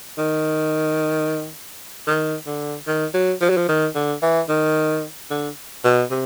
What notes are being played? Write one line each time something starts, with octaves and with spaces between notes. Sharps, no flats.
D#3
D#3
D3
D#3
F#3
F3
F#3
F3
D#3
D3
E3
D#3
D3
B2
C3